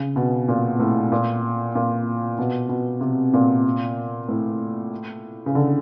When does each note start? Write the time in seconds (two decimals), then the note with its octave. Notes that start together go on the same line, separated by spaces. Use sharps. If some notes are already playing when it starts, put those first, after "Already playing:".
Already playing: C#3
0.16 B2
0.48 A#2
0.80 A2
1.12 A#2
1.75 A#2
2.39 B2
2.69 B2
3.01 C3
3.34 A#2
4.29 A2
5.46 C#3
5.55 D3